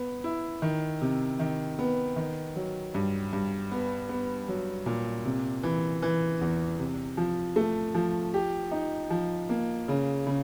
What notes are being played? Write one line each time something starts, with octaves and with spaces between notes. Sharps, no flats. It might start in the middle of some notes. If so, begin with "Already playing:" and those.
Already playing: B3
E4
D#3
C3
D#3
B3
D#3
F#3
G2
G2
B3
B3
F#3
A#2
C3
E3
E3
E2
C3
F3
A3
F3
G4
D#4
F3
A#3
C#3
C#3